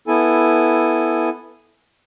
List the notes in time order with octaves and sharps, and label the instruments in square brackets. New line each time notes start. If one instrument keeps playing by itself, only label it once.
[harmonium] B3 E4 A4 G#5